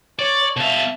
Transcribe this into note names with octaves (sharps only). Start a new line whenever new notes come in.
C#5 D5 C#6
B2 E5 F5 A5